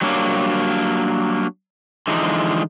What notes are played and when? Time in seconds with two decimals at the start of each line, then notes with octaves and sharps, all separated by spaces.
0.01 F#3 G3 A#3 D4 C#5
2.07 D3 E3 F3 G#3 D#4